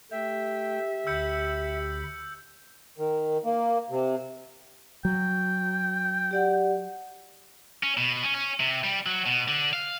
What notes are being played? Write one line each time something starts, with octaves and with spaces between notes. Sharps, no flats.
A3 G4 E5 G5
D2 B5 E6 G6 C#7
D#3
A#3
C3
F#3 G5
G4 D5 F#5
C#4
B2
C#4
C#4
C3
G3
F#3
B2
D3
F5